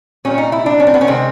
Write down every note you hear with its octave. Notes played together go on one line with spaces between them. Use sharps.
A#2 G3 C#4
D#4
E4
D4
C#4
C4
B3
C#4
C3 D#3 G#3 C4